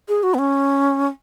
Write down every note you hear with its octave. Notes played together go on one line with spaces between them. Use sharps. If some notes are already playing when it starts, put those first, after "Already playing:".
G#4
F#4
B3
C#4